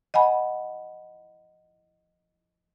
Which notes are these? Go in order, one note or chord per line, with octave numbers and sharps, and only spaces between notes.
D#5 F#5 G#5 B5